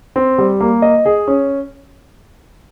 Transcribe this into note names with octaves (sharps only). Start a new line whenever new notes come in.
C4
G3
A#3
D#5
G#4
C#4